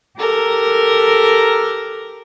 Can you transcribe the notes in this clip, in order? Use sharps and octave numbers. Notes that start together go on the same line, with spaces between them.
G4 A4 A#4 A#5